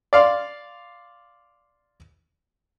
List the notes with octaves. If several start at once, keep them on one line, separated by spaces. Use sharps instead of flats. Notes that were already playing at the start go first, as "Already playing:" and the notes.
D5 F5 C6